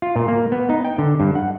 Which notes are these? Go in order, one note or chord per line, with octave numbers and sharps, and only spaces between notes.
F4
A#2
A#3
B3
D#4
G5
D3
G2
F#5